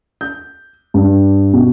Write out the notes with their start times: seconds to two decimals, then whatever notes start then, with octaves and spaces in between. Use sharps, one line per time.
0.21 G6
0.94 G2
1.53 B2